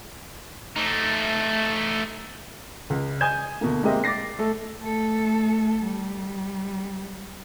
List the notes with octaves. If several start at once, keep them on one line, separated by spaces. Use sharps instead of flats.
A3 D#4
C#2
G#5 D#6 G6 G#6 E7
D2 B2 A#3
G#3 A#3 C4 G4 D#5 E5
D6 A6 A#6 C7
A3 A4
A3 A4
G3